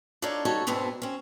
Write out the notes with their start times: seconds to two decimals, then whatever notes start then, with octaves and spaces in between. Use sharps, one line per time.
0.22 D4 D#4 F4 A4 C#5 D5
0.45 G3 D#4 F#4 A4 C#5
0.67 G#2 B2 B3 C4 D4 E4
1.02 C4 C#4